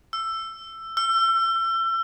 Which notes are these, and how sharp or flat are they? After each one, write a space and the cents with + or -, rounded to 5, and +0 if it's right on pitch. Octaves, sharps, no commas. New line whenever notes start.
E6 +15
E6 +35